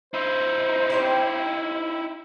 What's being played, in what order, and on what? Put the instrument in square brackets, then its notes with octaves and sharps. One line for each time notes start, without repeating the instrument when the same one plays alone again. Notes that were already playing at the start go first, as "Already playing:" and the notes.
[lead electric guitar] D#4 E4 [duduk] C5
[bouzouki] C4 G4 C#5